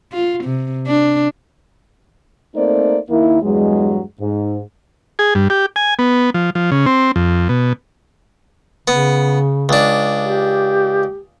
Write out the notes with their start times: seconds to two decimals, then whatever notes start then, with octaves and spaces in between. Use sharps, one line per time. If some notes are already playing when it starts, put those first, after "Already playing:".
0.13 F4
0.44 C3
0.87 D4
2.55 A3 A#3 C4 D#4 C5 D5
3.10 D#2 D#3 A#3 E4
3.42 E2 G2 F#3 G#3
4.20 G#2
5.19 G#4
5.35 G2
5.50 G4
5.76 G#5
5.99 B3
6.34 F3
6.55 F3
6.71 C#3
6.86 C4
7.16 F2
7.49 B2
8.88 C#3 B3
9.69 C#2 D4
10.20 G4